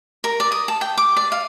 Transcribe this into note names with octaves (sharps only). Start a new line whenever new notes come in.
A#4
D5
D#6
A5
G5
D6
D5
F5